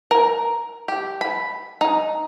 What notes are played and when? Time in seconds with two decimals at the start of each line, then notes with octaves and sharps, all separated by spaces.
0.11 A#4
0.88 G4
1.21 B5
1.81 D#4